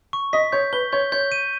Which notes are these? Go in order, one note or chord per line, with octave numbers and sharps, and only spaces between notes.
C#6
D#5 B6
C#5 G6
B4 G7
C#5 G6
C#5 G6
D#7